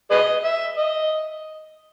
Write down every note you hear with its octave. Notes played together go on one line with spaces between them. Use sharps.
G#4 B4 D#5
E5
D#5